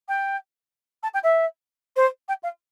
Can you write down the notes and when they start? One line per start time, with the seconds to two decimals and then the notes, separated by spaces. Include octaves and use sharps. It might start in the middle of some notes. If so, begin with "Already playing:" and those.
0.08 G5
1.03 A5
1.14 G5
1.23 E5
1.96 C5
2.28 G5
2.43 F5